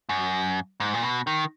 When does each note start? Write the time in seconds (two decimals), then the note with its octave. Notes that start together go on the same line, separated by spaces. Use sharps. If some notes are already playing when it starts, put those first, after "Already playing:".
0.09 F#2
0.80 G#2
0.94 A#2
1.03 B2
1.27 D#3